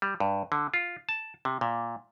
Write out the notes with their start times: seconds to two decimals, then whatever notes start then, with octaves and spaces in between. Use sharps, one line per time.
0.02 G3
0.20 G2
0.52 D3
0.74 F4
1.09 A5
1.45 C3
1.61 A#2